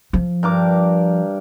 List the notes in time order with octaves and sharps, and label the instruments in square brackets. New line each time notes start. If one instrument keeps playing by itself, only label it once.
[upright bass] F3
[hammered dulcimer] G2 A#4 D6